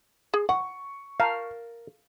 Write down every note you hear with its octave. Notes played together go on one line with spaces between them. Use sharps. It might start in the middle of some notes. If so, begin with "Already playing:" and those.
G#4
F#5 C#6
A#4 F5 A5